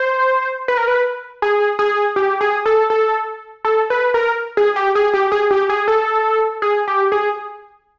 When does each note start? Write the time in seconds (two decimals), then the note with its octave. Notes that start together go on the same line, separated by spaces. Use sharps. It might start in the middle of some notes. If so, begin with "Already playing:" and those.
Already playing: C5
0.68 B4
0.77 A#4
0.88 B4
1.42 G#4
1.79 G#4
2.16 G4
2.41 G#4
2.66 A4
2.90 A4
3.65 A4
3.90 B4
4.14 A#4
4.57 G#4
4.76 G4
4.95 G#4
5.14 G4
5.32 G#4
5.51 G4
5.69 G#4
5.88 A4
6.62 G#4
6.88 G4
7.12 G#4